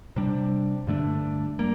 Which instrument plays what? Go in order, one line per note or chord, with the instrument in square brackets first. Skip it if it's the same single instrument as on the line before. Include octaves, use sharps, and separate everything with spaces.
[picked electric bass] C3 G3 D4
G2 D3 A3 D4
G3 A#3